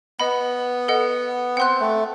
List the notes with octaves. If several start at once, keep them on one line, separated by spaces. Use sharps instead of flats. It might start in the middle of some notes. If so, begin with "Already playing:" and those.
B3 D#5 F#5 B5
A4 D#5 F#5
C4 F#5 C6 F#6
A3